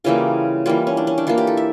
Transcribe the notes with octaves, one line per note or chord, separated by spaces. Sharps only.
C#3 E3 G3 A#3 F4
E3 G3 A#3 F4
C#4
D4
C#4
D4
E3 A#3 F4
G4
A4
E5